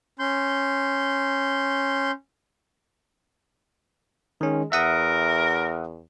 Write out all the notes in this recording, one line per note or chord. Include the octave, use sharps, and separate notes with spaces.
C#4 C6 G6
D#3 G#3 C#4
E2 A#4 E5 F#5 D#6